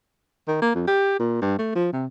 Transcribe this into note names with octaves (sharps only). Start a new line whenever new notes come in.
D#3
A#3
F2
G4
A#2
G2
A3
F3
C3